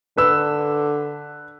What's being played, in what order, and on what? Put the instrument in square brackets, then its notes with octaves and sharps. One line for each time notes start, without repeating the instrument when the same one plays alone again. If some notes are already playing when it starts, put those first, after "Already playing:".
[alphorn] D3 [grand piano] B4 E6